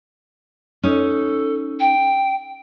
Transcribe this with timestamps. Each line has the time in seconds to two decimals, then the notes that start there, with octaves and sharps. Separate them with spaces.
0.83 C#4 D#4 A4
1.79 G5